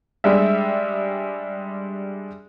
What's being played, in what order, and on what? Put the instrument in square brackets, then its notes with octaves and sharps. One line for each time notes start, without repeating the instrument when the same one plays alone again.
[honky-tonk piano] G3 G#3 D4 E5